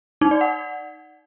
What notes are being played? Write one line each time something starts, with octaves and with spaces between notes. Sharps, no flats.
D#4
D5
F#5